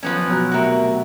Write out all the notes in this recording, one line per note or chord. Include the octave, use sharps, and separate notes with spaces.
F3 F#3 B3 C#4
B2 F#3 F#6
D2 C3 F#4 A#4 E5